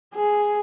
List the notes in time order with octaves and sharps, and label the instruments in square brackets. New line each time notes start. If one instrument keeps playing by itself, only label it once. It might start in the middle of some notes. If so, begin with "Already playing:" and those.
[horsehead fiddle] G#4